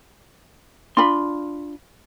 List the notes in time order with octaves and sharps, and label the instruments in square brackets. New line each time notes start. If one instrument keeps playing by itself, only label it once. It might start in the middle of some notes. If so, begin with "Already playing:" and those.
[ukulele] D4 F4 B5 [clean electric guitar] C6